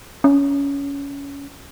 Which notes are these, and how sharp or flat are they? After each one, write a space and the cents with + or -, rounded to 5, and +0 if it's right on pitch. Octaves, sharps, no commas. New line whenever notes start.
C#4 +20